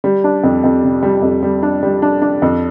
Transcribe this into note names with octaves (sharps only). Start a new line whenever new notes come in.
G3
D4
F2
F2
C3
G3
F2
G3
D4
G3
D4
D4
F2